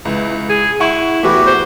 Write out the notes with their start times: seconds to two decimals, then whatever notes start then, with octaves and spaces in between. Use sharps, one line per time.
0.05 C#2 E3
0.49 G#4
0.80 E4 F#5 C#6
1.23 E2 E3 A3 F#4 G4
1.46 C5